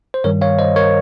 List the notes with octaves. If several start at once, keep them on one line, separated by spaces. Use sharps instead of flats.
C5
G2 D#3 G3 A#4 C#5
C#5 F5
C5 D#5
A#4 C#5